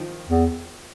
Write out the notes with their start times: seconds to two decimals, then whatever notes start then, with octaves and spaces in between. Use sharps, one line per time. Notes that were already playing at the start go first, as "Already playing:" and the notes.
Already playing: D#3 F3
0.28 E2